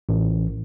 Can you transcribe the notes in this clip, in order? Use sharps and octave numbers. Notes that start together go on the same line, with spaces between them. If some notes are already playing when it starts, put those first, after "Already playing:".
A1